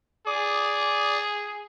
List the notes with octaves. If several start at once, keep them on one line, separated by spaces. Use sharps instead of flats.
G#4 D5 D6 D#6